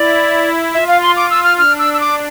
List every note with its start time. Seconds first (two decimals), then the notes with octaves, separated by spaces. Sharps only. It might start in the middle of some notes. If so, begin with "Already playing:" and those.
Already playing: E4 D5
0.74 F4 E5
0.88 F5
1.02 C6
1.16 D6
1.30 E6
1.44 F6
1.58 D4 F6
1.79 E6
1.94 E6
2.00 D6